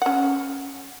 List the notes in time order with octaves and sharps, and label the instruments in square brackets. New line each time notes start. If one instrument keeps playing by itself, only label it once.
[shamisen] C#4 F#5